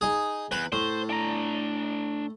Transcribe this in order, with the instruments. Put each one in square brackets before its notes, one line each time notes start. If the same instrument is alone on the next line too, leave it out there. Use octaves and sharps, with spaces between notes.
[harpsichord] D#4 G#4
[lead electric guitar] E2 [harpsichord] B4
[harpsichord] A2 [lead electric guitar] C5
[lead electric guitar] D4 A#5